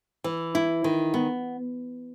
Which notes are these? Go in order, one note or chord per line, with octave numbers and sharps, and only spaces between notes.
E3
E4
D#3
B3